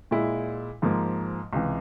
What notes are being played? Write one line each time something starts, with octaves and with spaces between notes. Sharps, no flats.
A#2 G#3 E4
G#2 F3 A#3
C#2 C3 E3